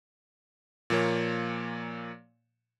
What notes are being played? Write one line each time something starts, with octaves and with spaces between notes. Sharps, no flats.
A#2 F3 A#3 C#5